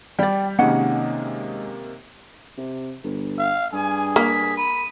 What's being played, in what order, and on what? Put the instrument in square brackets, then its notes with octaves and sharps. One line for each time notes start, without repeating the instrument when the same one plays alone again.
[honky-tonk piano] G3 [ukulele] D5 G5
[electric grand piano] C3 D#3 A#3 [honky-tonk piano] G#3 [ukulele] C#4 F#5
[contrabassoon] C3
G1
[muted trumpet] F5
[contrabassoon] G2 [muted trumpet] G#4 [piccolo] G#5
[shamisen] A#3 [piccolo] B6
[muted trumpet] B5 [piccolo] D#7